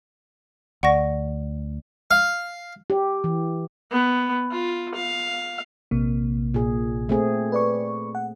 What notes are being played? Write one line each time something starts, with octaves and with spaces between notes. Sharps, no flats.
D2 D5 F#5 C#6 A#6
F5
G4
E3
B3
F4
F5
A#1 C3 A#3
A#2 G#4
A3 C4 G#4
B4 D5 C#6
F#5